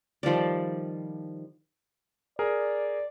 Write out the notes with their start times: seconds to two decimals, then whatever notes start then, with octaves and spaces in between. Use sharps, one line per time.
0.23 D#3 F3 G3 D5
2.39 G#4 A#4 D5